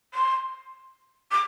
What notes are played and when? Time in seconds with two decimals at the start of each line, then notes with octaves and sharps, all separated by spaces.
0.14 C6
1.31 D6